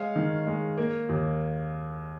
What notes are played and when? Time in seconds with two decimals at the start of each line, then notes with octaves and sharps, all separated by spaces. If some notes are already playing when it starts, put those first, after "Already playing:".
Already playing: G#3 C#5 F5
0.16 D#3
0.47 G#3
0.77 A#3
1.09 D#2